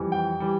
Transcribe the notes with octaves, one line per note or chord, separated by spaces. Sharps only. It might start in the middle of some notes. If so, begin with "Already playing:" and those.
Already playing: F2 E3 G3
G5
E3 G3